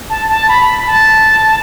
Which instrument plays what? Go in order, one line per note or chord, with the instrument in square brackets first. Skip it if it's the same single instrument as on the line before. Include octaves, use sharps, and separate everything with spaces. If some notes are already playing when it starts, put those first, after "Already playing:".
[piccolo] A5
A5
B5
A5